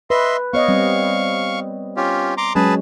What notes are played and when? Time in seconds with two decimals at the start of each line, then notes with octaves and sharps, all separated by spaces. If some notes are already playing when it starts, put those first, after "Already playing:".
0.10 B4 D#5 E5 C6
0.53 B3 C#5 D#5 F5 C#6
0.68 G3 C4
1.97 C#4 F4 G4
2.37 A#5 C6 D6
2.55 F#3 G#3 C#4 G#4 B4 A5